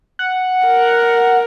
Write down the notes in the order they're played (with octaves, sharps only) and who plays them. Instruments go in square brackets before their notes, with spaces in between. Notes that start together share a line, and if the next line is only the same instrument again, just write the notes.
[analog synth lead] F#5
[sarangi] A#4